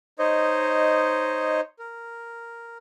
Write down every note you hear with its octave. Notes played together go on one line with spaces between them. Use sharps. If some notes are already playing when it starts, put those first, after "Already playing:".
D#4 C5 C#5 D#5
A#4